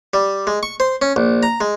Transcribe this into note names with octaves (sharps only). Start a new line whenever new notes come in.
G3
G#3
C#6
C5
C#4
A#1
A#5
G#3